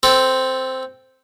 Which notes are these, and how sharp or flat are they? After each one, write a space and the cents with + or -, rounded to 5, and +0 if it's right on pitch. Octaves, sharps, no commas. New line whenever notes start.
C4 -5 A4 +0